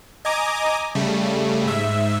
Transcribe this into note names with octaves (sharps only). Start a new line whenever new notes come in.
D#5 G#5 A#5 D6
C#3 G3 A3
G#2 E5